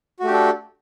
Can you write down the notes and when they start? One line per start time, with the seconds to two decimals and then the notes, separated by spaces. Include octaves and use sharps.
0.20 F#4
0.23 A3
0.27 G4
0.30 D4
0.34 A4